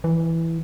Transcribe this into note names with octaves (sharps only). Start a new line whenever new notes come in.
E3